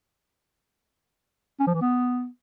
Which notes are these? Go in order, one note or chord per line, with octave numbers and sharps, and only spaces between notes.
C#4
F3
E3
B3